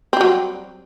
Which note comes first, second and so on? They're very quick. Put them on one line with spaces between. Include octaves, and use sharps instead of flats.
C4 G3 F#3